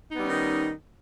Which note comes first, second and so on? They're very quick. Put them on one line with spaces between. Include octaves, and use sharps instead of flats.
D#4 B3 G3 C#4 D#3